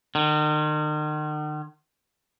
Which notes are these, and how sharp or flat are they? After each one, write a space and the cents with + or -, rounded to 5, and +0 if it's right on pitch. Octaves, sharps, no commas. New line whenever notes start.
D#3 -40